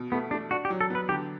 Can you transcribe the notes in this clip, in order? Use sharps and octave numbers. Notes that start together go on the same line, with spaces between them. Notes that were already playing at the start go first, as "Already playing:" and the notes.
Already playing: B2
A3 B3
A3 D4
D4 F#4
G4
F#3
A4
B3 B4
D3 G4